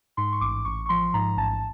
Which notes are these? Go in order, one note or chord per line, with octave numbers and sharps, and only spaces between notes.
G#2 C6
C#6
A1 D6
A1 C#6
C#6
F3 C6
G#2 A#5
A1 A5